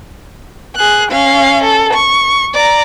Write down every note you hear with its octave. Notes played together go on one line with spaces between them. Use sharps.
G#4 F#6
C#4 F5
A4
C#6
D5 A#5